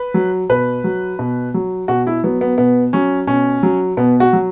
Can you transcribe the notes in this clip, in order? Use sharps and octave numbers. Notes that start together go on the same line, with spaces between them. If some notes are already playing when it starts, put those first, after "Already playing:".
Already playing: B4
F#3
B2 B4
F#3
B2
F#3
B2 F#4
E4
F#3 B3
B3
B2 B3
F#3 C#4
B2 C#4
F#3
B2 B3
F#4
F#3